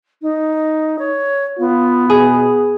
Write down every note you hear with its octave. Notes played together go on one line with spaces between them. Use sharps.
D#4
C#5
B3 F4
B2 G#4